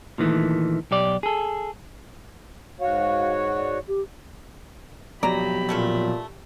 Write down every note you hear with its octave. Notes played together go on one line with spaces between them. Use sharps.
A#2 D#3 E3 A3
B1 G4 D5
G#4 A4
G#2 F#4 C#5 F5
D5
G4
F2 B2 F#3 G4 D5 A#5 B5
A#2 A3 C#4 A4